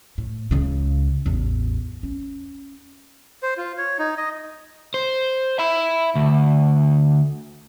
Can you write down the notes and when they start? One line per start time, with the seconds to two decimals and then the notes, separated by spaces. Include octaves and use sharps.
0.18 A2
0.51 C#2 C#3
1.26 A1 E2
2.03 C#4
3.42 C5
3.58 F4
3.78 C#5
3.99 D#4
4.17 D#5
4.94 C5
5.59 E5 B5
6.15 D2